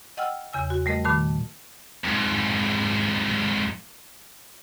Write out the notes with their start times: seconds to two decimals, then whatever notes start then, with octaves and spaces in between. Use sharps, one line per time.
0.17 D#5 F#5 G5 E6 F6
0.53 E2 C#3 G#5 E6
0.70 F#4
0.86 G3 A3 A#4 D#5
1.04 A#2 D#3 A3 A5 B5
2.04 F2 G#2